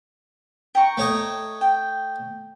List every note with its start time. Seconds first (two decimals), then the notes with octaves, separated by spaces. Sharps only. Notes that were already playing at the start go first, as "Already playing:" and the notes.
0.75 G5 A#5 C#6
0.97 A3 C#5 D#5
1.61 G5